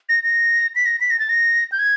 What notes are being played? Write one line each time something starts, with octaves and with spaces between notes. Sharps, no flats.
A#6
A#6
B6
A#6
B6
A#6
A6
A#6
G6
G#6